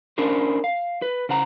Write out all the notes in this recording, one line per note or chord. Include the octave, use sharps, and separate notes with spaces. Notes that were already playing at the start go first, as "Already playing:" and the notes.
C#4 D4 E4 A#4 C5
F5
B4
C#3 C5 F#5 A#5